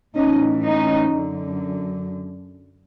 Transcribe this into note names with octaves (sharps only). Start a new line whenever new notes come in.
A2 E3 C#4 D#4
C#4 D#4
F#2 D3